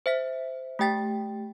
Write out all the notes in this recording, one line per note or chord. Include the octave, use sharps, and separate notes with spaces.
C5 E5 B6
A3 G4 G5 A6 B6